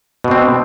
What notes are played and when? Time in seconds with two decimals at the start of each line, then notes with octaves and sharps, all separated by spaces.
0.24 B2
0.28 D4
0.31 C4